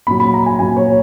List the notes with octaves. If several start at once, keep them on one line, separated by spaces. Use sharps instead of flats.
A#2 F#3 B5
B5
A#5
G#5
A#2 F#3 G#5
C#5